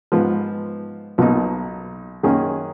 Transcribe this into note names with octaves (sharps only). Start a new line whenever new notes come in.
G#2 F3 B3
B1 B2 F#3 A#3 D#4
F#2 D#3 A#3 C#4 G#4